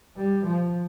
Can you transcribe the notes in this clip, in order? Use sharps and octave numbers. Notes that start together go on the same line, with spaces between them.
G3
F3